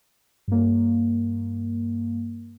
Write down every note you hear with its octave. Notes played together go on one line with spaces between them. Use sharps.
G2 A#3